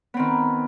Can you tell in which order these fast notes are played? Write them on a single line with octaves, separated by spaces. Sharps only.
B3 C4 D#3